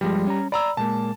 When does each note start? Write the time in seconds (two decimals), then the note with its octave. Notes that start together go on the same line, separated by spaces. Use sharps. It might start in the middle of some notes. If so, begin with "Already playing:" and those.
0.01 G2 F3 G3 G#3
0.27 C#4 A#5
0.52 D5 A#5 B5 E6
0.77 A#2 G#3 A#3 A5